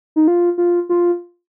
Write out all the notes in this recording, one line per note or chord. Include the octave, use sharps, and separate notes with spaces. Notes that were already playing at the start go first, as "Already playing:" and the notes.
D#4
F4
F4
F4